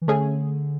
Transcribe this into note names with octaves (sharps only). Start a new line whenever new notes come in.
E3
D3 A3 C#4 G#4